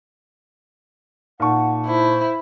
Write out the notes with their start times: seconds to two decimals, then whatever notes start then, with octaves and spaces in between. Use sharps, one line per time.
1.40 A#2 D#4 F#5 A5 C#6
1.87 E4 C5